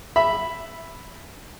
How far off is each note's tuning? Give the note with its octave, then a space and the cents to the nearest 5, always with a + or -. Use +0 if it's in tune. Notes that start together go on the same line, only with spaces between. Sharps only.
E5 +5 B5 +0